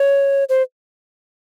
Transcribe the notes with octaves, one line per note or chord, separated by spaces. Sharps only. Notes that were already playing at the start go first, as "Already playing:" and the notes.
Already playing: C#5
C5